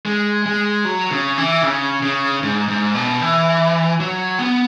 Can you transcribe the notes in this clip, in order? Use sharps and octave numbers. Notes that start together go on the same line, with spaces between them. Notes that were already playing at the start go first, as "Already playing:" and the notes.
G#3
G#3
F#3
C#3
E3
C#3
C#3
G#2
G#2
B2
E3
F#3
B3